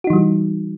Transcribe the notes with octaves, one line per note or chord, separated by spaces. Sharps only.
E3 G3 D#4 F#4